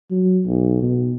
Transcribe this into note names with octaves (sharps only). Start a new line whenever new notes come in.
F#3
B1
B2